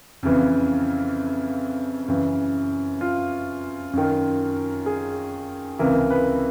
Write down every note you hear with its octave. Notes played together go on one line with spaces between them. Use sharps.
F2 C#3 E3
F#2 C#3 E3
F4
F#2 D#3
G#4
C#2 C3 E3 A#4
B4